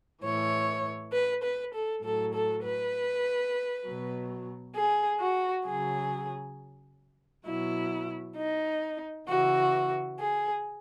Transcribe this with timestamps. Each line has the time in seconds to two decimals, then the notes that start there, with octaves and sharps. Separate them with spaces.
0.22 A2 E3 C#5
1.12 B4
1.42 B4
1.73 A4
2.03 A2 F#3 A4
2.33 A4
2.64 B4
3.84 B2 F#3
4.74 G#4
5.19 F#4
5.65 C#3 F#3 G#4
7.46 B2 F#3 E4
8.36 D#4
9.27 C#3 E3 F#4
10.18 G#4